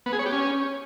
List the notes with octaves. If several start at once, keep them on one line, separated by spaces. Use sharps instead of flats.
B3
G#4
C#5
G4
C#4